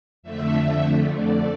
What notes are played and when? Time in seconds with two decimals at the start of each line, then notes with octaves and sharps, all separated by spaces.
0.23 F2 D3 A3 E5
1.12 D5